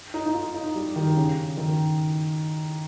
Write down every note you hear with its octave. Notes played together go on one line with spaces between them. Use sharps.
D#4
D#4
F4
D#4
G3
D#3
C#3
D#3